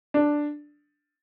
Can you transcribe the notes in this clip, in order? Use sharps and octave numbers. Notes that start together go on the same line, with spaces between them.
D4